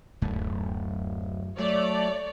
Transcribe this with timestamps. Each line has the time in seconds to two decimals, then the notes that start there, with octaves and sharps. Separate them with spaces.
0.22 D1 F#2 A3
1.59 F#3 A3 C#5 D5